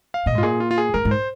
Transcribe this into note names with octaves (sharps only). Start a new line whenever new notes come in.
F5
A#2 D#5
G#2
F4
A#2 G#4
F4
F4
G#4
G#2 A#4
G#2
C5